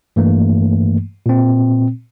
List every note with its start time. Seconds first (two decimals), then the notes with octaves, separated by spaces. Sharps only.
0.16 G2 E3 A3 A#3
1.26 A#2 C4